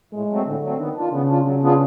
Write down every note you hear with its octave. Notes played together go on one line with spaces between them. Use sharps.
A2 G#3
F#3 A3 C4
A2 D3
F#3 A3 C4
D#3 B3
D4 F4
C#3 B3
D4 F4
C#3 F#3
B3 D4 F4 G#4